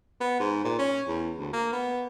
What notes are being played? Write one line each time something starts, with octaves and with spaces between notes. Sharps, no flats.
B3
G#2
A#2
C#4
E2
D2
A#3
B3